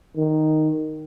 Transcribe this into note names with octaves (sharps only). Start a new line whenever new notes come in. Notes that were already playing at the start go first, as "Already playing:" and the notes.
D#3